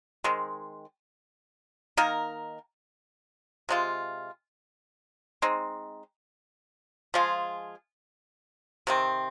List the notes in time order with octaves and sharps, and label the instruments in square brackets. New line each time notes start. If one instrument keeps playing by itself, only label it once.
[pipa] D#3 G#3 C4
D#3 A#3 D#4 A#4
C3 G#3 F4
G#3 C4 D#4
F3 G#3 F4 G#4
C3 D#3 C4